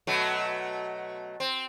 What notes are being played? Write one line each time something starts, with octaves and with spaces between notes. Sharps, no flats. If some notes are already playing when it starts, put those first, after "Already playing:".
B2 F#3 A3
C4